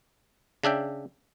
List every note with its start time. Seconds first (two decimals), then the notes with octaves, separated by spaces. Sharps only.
0.64 C#3 D4 E5 G5